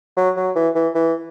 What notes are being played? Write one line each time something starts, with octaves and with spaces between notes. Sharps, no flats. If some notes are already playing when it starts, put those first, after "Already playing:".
F#3
F#3
E3
E3
E3